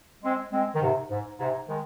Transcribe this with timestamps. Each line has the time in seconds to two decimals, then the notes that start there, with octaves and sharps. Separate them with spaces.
0.23 G#3 C4
0.52 G#3 C4
0.74 D#3
0.81 G#2 C3
1.10 G#2
1.39 G#2 C3
1.68 D#3 G#3